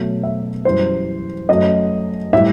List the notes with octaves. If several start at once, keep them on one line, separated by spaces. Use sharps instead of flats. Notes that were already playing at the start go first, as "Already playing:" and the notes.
Already playing: B2 F#3 A3
E5
F#2 E3 G3 C5
F#2 F#3 A3 D#5
A2 G3 E5